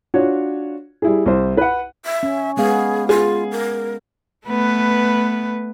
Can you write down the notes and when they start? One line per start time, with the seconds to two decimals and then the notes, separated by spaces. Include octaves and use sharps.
0.14 D4 F4 F#4 C#5
1.02 G3 E4 G#4
1.26 C2 C5
1.57 B4 F#5
2.04 E5
2.23 C#4
2.57 G#3 B3 G#4 F5
3.09 F4 G#4
3.51 A#4
4.46 A3 B3 B4